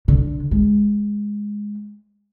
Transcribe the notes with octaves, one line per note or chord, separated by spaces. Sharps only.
D3
G#3